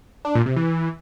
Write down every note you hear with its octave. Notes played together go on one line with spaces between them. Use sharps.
D4
A#2
C3
E3